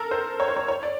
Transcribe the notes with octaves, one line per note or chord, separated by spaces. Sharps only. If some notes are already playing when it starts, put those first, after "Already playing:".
Already playing: A4 A#4
C5
C#5
C5
C#5
C#5
D5